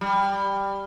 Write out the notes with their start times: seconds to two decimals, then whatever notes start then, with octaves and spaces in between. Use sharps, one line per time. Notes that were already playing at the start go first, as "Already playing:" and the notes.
0.01 G3